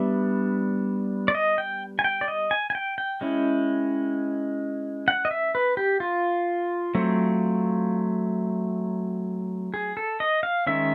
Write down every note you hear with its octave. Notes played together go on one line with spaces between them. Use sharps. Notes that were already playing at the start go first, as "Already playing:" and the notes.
Already playing: G3 B3 D4 E5
D5
D#5
G5
G#5
G5
D5
D#5
G#5
G#5
G5
G5
G#3 C#4 E4
F#5
D#5
E5
B4
G4
F4
F#3 A3 C4
G#4
A4
D#5
F5
D#3 G#3 C#4 E5